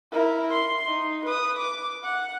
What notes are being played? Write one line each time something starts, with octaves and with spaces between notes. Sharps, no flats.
E4 A#4
C6
D#4
B4 D#6
D6
F#5